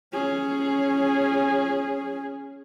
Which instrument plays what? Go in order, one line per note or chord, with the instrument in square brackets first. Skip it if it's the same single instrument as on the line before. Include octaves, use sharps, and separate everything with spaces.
[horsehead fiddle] C#4 G#4